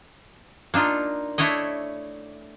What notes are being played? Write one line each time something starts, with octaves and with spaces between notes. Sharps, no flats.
A#3 D4 D#4 F4
A3 D4 E4 C#5 D#5